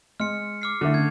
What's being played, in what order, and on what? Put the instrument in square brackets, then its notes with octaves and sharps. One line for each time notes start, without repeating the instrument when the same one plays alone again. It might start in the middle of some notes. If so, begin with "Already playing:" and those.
[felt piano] G#3 D#5 C6 [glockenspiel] F6 C#7
[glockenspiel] D6 F6 C7
[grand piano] D3 A3 [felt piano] E4 A4 E5
[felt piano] C#3 [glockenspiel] G#6